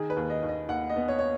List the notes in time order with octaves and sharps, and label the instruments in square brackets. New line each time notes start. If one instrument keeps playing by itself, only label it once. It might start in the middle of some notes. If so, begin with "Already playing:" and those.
Already playing: [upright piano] D#3 G#4
B4
D#2
D#5
D#2
D#5
D#2 F#5
D#5
B3
C#5
C#5